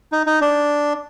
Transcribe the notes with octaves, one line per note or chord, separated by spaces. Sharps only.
D#4
D#4
D4